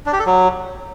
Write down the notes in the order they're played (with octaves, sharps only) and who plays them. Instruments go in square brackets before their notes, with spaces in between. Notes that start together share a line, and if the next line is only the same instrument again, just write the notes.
[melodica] D4
G4
A4
F#3